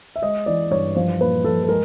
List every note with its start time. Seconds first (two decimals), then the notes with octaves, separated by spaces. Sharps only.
0.16 E5
0.22 G#3 D#5
0.46 E3 D5
0.71 G2 C#5
0.95 F3 C5
1.20 A#2 B4
1.44 F3 A4
1.63 A4
1.69 G#3 A#4